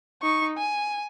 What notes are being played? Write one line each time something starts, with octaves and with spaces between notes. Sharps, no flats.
D#4 C#6
G#5